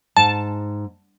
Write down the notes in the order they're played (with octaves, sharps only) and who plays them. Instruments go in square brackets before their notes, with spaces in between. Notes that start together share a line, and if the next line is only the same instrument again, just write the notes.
[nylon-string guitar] G#2 [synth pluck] A5